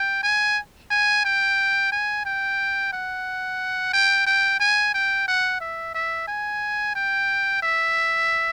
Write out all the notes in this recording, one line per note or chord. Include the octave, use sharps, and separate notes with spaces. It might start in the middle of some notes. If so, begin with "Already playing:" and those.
Already playing: G5
G#5
G#5
G5
G#5
G5
F#5
G5
G5
G#5
G5
F#5
E5
E5
G#5
G5
E5